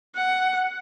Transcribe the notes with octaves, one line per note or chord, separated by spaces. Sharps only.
F#5